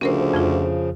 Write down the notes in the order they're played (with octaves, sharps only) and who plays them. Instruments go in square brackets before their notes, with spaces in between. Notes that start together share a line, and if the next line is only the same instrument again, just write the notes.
[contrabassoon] D2 [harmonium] C#3 F3 [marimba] C#4 A#4 C5
[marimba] F2 F4